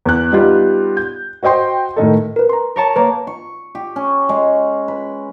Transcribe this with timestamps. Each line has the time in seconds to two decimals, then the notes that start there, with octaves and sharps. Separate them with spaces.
0.06 E2 F#6
0.32 G3 B3 D#4 F4 G4
0.97 G6
1.43 F#4 C5 D#5 G5 C6
1.96 A2 D#3 D#4 A4
2.36 A#4 B4
2.49 A#5 C6
2.76 A#4 C#5 A5
2.96 A#3 B4 C#5 A#5
3.27 C#6
3.75 G4
3.96 C#4
4.29 G#3
4.88 B4